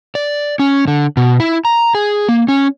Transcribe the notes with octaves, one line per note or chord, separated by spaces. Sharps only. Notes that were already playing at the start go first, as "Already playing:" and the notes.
D5
C#4
D3
B2
E4
A#5
G#4
A#3
C#4